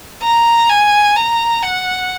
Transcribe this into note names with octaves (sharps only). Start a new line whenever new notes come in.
A#5
G#5
A#5
F#5